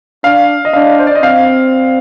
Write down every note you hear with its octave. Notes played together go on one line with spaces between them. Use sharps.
D4 F5
D#5
D4 F5
C5
D5
D#5
C4 F5